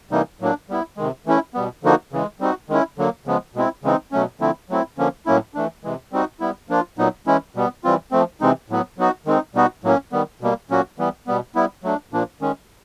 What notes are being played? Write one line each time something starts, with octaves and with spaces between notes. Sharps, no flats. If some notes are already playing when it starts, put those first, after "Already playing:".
C3 E3 G3 A#3 D#4
A2 F#3 A#3 D4
G3 B3 E4
C3 D#3 G#3
E3 A3 C#4 E4
B2 G3 B3
D3 F3 A#3 D#4 F#4
C#3 E3 G#3
G3 C4 D#4 F#4
D#3 G#3 C#4 E4
D3 F#3 A#3
C#3 F3 G#3 B3
B2 G#3 C4 E4
C#3 E3 G#3 C4 D#4
B2 F#3 A3 C#4
D3 F3 A3 C4 E4
F#3 A3 C4 E4
D3 F3 A#3 C#4
A2 F#3 A#3 C#4 E4
E3 A3 D4
C3 E3 G#3
G3 C4 D#4 F#4
G3 B3 E4
F3 A#3 D4 F4
A#2 F#3 B3 D#4
E3 G#3 C#4 E4
B2 G3 B3
E3 G3 C4 F4
F3 A3 C4
C3 E3 G#3 C4 D#4
A2 F#3 B3
F#3 B3 D#4 F#4
D#3 G#3 C4 D#4
B2 G3 B3 D#4 F#4
A2 F#3 A#3 C#4
D#3 G3 B3
B2 G3 A#3
A#2 F#3 A#3 C#4 F#4
E3 G3 B3
B2 G3 B3
G3 B3 E4
F#3 A3 D4
A#2 F3 A#3 D4
D#3 G#3 C#4